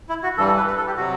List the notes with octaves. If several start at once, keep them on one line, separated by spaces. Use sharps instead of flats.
E4
F#4
G2 E3 G3 A4
A4
B4
B4
A4
G4
C3 F#3 F#4